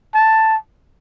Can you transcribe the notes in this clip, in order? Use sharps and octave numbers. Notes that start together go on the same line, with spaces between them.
A5